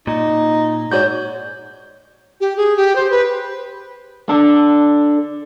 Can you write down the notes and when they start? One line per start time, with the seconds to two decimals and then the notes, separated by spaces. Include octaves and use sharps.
0.07 A#2 D#4
0.92 G#2 F#4 C#5 D5 G6
2.41 G4
2.57 G#4
2.77 G4
2.96 C5
3.11 B4
4.29 D4 A4